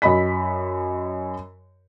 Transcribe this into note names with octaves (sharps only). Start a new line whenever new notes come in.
F#2 D#5 B5 B6